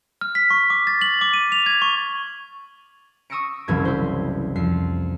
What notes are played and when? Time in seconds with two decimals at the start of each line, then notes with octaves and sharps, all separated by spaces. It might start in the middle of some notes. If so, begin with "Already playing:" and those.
0.21 F6
0.35 B6
0.50 C#6
0.70 D6
0.87 A6
1.02 F#7
1.21 D6
1.34 D#7
1.52 F7
1.66 G#6
1.82 C#6
3.30 C#6 D#6 E6 A#6 C#7 D7
3.68 F#1 C2 E3 F#3 E4 G#6
3.85 E4 C5
4.56 F2 C7